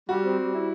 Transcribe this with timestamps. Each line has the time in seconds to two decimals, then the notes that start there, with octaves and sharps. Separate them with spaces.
0.09 G3 F#4
0.24 C4
0.39 G3
0.54 E4